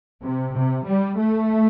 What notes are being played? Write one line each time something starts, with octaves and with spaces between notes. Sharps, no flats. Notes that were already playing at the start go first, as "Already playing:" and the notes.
C3
C3
G3
A3